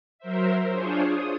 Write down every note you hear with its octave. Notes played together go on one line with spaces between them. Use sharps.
F#3 A#4 C5 E5
D4 F4 G#4 C5 C#5
D#6